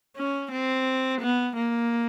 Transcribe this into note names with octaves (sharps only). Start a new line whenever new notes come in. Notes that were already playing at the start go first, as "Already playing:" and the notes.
C#4
C4
B3
A#3